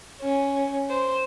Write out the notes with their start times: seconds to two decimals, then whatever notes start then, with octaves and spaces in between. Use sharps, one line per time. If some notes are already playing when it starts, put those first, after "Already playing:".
0.21 C#4
0.90 C5